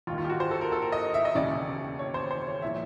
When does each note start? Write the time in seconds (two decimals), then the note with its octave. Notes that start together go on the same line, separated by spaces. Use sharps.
0.07 D#2 F4
0.12 D#3
0.18 F4
0.24 G4
0.30 F#4
0.40 C5
0.51 A4
0.61 A#4
0.72 A4
0.82 A#4
0.92 D#5
1.14 E5
1.25 D#5
1.35 E1 D#2 C#3 D5
1.99 C#5
2.14 C5
2.31 C5
2.47 C#5
2.62 A#2 F3 E5